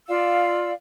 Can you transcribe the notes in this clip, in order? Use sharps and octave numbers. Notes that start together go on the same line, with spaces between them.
F4 D5 F5 E6